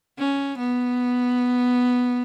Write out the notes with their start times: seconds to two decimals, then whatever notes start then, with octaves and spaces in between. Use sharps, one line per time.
0.18 C#4
0.58 B3